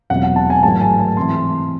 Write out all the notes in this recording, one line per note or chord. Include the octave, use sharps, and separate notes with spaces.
E1 E2 C3 F#3 F#5
F#5
A5
G#5
A1 G#2 D#3 F#3 A5
G#5
A5
C3 E3 C6